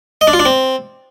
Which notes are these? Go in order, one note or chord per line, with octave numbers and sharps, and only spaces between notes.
D#5
D4
F4
D4
C4